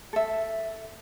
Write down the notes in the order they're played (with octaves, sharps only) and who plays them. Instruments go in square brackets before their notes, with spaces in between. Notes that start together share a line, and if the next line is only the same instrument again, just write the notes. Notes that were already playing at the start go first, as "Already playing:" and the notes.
[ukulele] A4 E5